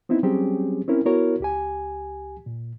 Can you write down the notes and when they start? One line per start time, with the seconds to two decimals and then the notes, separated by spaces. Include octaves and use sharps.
0.09 B3 C4 D#4 E4
0.23 F#3 G3 C4 C#4 G4 G#4
0.88 C4 C#4 E4 A#4
1.05 B3 E4 F#4 A#4 C#5
1.40 C#2 G4 G#5
2.46 A#2